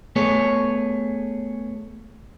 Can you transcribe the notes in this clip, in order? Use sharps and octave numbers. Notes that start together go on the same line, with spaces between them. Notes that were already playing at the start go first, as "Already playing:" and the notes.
A3 B3 G#4 C#5